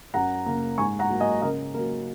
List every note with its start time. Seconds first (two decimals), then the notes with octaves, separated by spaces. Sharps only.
0.14 F#2 F#5 A#5
0.46 C#3 A#3
0.78 G#2 G#5 C#6
0.99 F#5 A#5
1.10 F#3 A#3
1.20 D#5 G#5
1.42 C#3 A#4 D#5
1.74 F#3 A#3 A#4